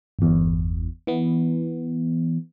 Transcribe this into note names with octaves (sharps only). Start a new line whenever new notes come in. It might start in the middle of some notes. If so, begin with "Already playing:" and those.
G1 E2
E3 B3